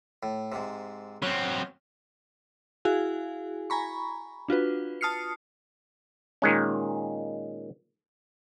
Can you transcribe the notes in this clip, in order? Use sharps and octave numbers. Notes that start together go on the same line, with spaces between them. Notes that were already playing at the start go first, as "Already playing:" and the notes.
A2
G#2 C3
F#3 C4 C#4
E4 F#4 G#4 F5 G#5
G#5 A#5 B5 C#6
D4 F4 F#4 B4
A5 D#6 F6 C7 C#7
A#2 D#3 G#3 C#4